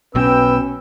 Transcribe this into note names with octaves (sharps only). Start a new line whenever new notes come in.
B1 B2 C#4 B4 G5 E6